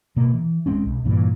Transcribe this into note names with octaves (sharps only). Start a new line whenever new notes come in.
B2 A#3
E3
D1 G#3 C4 C#4
B1
G2 A#2 E3